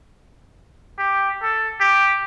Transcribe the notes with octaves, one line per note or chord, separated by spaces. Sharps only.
G4
A4
G4